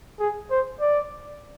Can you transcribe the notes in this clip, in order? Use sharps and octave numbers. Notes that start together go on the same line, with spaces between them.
G#4
C5
D5